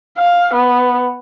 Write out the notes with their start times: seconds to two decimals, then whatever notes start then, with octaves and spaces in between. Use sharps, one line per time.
0.18 F5
0.54 B3